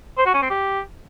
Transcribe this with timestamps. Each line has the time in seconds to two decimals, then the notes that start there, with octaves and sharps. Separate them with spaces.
0.18 C5
0.26 F#4
0.34 C#4
0.42 C4
0.50 G4